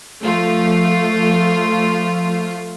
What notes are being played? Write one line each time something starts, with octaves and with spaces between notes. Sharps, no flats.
F3 A3 F4